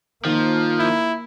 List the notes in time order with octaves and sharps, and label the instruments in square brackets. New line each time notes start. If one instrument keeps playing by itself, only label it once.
[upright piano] D#3 [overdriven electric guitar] F3 [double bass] A#3
[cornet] E4